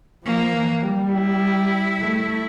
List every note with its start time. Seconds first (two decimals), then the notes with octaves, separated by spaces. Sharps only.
0.24 F3 A#3
0.53 E3
0.83 G3
1.12 E4
2.01 A3